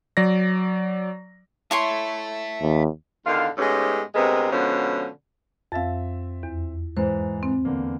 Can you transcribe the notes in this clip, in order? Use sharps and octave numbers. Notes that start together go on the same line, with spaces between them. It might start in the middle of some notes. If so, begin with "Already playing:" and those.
F#3 D5 A#6
E4 C#5 E5 A5 C6
D#2
E2 D3 D#3 F4 F5
G#2 G#3 A3 B3 C#4 G4
D2 C3 G#3 B3 A#4 C5
B2 D3 F3 G#3 C#4
F2 C4 E5 F5 A6
E2
G#2 E3 C5
C4
E2 D3 A#3